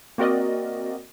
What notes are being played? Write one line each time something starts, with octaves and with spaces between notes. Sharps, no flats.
A#3 C4 F#4 A#4 D5 D#5